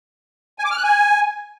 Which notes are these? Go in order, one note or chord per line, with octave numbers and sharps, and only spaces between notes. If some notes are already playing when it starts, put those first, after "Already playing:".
G#5
D6
F6
F#6
G#5